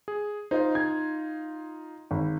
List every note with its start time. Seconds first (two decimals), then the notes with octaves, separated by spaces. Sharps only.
0.08 G#4
0.51 D#4 F4 C5 D#5
0.75 G#6
2.11 G#1